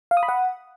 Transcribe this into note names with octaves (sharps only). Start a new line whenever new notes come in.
F5
D#6
B5
F#5